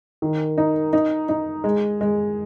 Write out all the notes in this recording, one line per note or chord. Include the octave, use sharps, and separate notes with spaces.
D#3
D#4
D#4
D#4
G#3
G#3